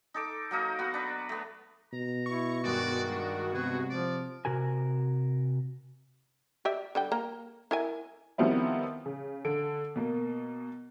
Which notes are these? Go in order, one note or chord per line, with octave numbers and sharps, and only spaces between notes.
D#4 A4 D6
F#3 A#3 D#4 A#4
B3 F#4 F#5
D4 B4
A3 B3
B2 A#5
E4 C#6
G2 D#3 G#3 F#4 D5
D4
C3 B3 G#4
F3 D5
C3 F#4 A#4 G#5
G4 D5 E5
D3 G3 G5
A#3 A#5
E4 A#4 G#5
D#3 F3 G3 B3 C4 E4
C#3
D3 D7
B2 A#3